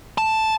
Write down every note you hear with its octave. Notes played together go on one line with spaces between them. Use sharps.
A5